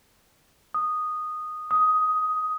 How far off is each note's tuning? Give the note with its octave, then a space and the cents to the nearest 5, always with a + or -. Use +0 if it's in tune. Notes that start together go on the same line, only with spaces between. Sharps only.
D#6 -10
D#6 +10